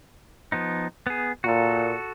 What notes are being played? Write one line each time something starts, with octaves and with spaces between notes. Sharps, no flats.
F3 B3 D#4
B3 G#4
A#2 F#4 A4